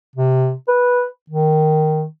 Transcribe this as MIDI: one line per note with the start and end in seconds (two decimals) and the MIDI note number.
0.16 0.54 48
0.68 1.06 71
1.30 2.05 51